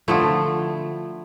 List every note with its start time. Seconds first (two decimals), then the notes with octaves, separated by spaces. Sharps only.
0.08 D3 F3 A3 E4